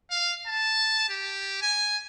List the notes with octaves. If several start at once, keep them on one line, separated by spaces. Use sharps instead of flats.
F5
A5
G4
G#5